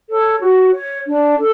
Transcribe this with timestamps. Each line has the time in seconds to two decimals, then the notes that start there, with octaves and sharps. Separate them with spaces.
0.08 A4 C#5
0.40 F#4
0.73 C#5
1.06 D4
1.38 A4